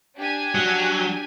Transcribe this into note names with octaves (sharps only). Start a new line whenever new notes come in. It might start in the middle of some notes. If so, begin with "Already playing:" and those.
D4 G4 G#5
F#3